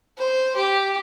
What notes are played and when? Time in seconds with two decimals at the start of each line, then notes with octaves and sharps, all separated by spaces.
0.18 C5
0.56 G4